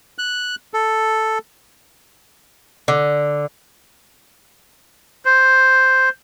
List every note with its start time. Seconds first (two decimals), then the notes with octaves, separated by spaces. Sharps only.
0.18 F#6
0.74 A4
2.88 D3
5.25 C5